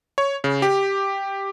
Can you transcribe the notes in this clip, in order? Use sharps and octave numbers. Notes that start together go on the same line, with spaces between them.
C#5
C#3
G4